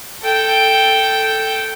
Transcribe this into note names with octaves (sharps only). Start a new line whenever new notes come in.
A4 G5